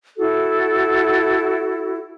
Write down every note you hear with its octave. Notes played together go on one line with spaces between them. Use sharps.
E4 F#4 A4